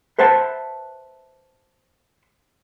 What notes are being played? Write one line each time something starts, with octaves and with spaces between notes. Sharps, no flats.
B4 C5 E5 F#5 A5